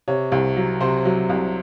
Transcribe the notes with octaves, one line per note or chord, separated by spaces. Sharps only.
C3 C#5
C2
F#3
C3 C5
F#3
C2